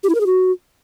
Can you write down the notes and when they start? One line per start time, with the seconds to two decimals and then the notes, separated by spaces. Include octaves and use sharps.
0.04 G4
0.09 E4
0.15 A#4
0.21 G#4
0.26 F#4